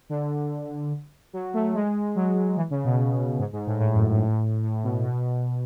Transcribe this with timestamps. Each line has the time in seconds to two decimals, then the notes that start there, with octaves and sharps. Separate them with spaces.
0.09 D3
1.33 F#3
1.54 A3
1.74 G#3
2.16 F#3
2.57 E3
2.71 C#3
2.85 B2
3.39 G#2
3.53 G#2
3.67 A2
3.80 A2
3.95 F#2
4.08 A2
4.22 A2
4.63 A2
4.83 B2
5.04 B2